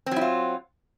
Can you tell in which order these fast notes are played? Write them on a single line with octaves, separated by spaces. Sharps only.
C4 F#3 E4 F4